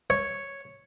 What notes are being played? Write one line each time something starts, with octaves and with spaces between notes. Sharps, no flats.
C#5